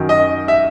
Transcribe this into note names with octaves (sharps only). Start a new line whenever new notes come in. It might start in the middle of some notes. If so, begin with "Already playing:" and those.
Already playing: F#2 D#3 F#3
D#5
E5